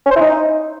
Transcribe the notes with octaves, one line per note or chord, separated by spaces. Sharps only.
C#4
C5
E4
D#4